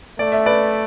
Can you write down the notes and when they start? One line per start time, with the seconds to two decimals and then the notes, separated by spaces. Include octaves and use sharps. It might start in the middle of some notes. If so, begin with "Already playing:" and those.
0.19 A3 D5
0.32 E5
0.46 B4 D5